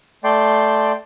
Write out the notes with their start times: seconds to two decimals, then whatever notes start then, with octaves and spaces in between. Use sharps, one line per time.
0.24 A3 D5 G5 C6